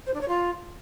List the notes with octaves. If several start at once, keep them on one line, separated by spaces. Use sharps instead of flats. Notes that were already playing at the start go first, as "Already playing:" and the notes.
C5
D4
C#5
F4